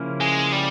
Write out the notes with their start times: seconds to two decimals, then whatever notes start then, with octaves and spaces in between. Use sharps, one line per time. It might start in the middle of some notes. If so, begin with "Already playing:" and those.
Already playing: C#3 F3 A#3 C#4 E4
0.21 G#3
0.52 G3